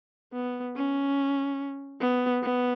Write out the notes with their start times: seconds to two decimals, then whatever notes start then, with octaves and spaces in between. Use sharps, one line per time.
0.33 B3
0.76 C#4
2.01 B3
2.43 B3